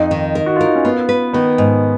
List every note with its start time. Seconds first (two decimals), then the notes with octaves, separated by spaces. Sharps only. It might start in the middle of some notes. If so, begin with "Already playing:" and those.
Already playing: F2 D#4
0.11 D#3
0.35 A#4
0.46 F#4
0.56 F4 A#4
0.66 D#4
0.75 C#4
0.85 B3 F4
1.09 B4
1.33 D#3 B3
1.58 G#2